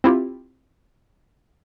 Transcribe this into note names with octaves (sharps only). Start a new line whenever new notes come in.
C4 E4 F4 G4